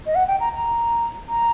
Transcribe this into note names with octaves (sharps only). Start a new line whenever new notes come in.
D#5
F#5
G5
A#5
A#5
A#5